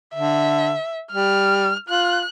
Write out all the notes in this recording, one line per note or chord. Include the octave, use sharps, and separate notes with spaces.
D3 E5
G3 F6
F4 F#6